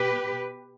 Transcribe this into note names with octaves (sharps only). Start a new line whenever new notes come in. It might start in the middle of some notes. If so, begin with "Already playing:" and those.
Already playing: B2 G4 B4